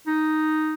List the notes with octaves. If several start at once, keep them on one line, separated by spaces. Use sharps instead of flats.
D#4